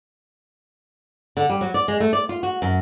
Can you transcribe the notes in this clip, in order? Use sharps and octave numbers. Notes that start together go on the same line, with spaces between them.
D3
G3
F#3
D5
G#3
A3
D5
F4
F#4
F#2